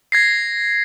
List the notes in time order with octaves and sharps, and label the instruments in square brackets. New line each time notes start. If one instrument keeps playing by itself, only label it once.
[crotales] G#6 A#6 C7